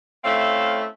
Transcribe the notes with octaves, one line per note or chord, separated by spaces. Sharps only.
A3 C4 C#4 E4 E5 F5